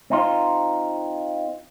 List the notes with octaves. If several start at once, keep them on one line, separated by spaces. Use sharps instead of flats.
C4 D#4 F4